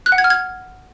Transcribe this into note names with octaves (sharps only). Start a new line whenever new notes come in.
F#6
F#5
G#6
F6
G#6